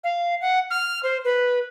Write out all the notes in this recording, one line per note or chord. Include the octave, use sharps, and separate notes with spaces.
F5
F#5
F6
C5
B4